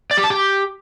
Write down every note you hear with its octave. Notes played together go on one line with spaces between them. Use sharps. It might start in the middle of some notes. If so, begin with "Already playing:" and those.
D5
G4
A5
G4